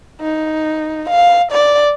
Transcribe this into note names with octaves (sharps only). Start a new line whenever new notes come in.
D#4
F5
D5